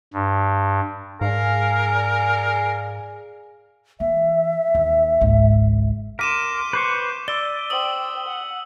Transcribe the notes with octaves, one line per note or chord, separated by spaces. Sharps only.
G2
G#2 G#4 A#4 D5 F5 G#5
E3 E5
D#2
G#1 C#2
A#4 C6 D6 B6 D#7 E7
B4 C5 C#6
D5 E6 G7
C5 G5 D#6 F#7
F#5